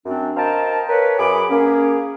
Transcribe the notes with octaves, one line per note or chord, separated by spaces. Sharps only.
F#2 C4 D4
A#4 C5 D#5 F5 G5 A5
A#4 B4 C#5
F#2 G#4 B5 D6
A#3 C#4 G#4